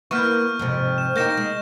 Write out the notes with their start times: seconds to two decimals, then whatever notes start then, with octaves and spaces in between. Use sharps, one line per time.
0.11 A#3 B3 E4 C#6 F6 G6
0.59 F2 G#2 C3
0.98 E7
1.16 A#3 D#4 G4 G6 A#6 E7
1.37 G#3